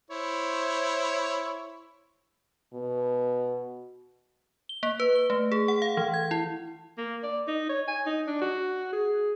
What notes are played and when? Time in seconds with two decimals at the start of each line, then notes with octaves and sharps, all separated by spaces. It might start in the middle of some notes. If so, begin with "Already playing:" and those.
0.10 E4 C5 C#5
2.74 B2
4.69 G7
4.83 A#3
5.00 B4
5.15 G7
5.30 A3
5.52 G#4
5.68 F#5
5.82 F5
5.97 E3
6.14 G#6
6.31 E4
6.98 A#3
7.23 D5
7.48 D#4
7.69 C#5
7.88 G#5
8.06 D#4
8.27 D4
8.41 F#4
8.93 G#4